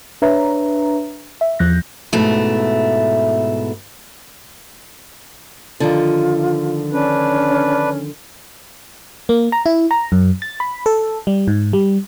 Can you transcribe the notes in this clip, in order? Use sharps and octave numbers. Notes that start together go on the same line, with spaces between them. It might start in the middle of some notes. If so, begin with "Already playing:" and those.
D4 B4 C#5 E5 A#5
E5
E2 F3 F#6 G6 A#6
G#2 B2 A3 E4
D3 D#3 F3 F4
C#4 D4 B4
A#3
A#5
E4
A#5
F#2
A6
B5
A4
G3
G#2
G3